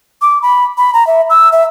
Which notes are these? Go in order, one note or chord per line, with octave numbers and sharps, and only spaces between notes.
D6
B5
B5
A#5
E5
E6
E5